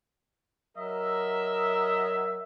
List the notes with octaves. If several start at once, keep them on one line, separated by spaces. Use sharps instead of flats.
F#3 A#4 D#5 E5